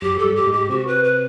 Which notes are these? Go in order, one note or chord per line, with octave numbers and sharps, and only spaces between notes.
F#2 F#3 G4
A4
G2 G3
G4
G#2 G#3
G4
C3 C4 F#4
B4
B4